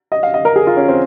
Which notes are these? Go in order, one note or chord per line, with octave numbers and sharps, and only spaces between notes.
D#5
F5
D#5
A#4
G#4
F4
C#4
C4